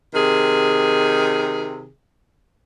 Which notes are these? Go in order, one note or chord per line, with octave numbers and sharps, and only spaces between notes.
C3 D#3 G#4